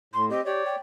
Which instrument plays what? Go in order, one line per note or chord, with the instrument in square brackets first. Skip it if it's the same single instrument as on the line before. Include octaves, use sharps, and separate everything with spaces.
[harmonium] A2 [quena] C6
[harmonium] C4 G4 [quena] D#5
[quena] G4 [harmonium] C#5 D5
[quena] G5